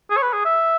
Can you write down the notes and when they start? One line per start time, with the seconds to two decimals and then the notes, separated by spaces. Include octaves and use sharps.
0.11 G#4
0.17 C#5
0.22 B4
0.33 G#4
0.45 E5